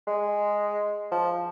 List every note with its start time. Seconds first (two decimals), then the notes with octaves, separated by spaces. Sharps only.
0.07 G#3
1.12 F3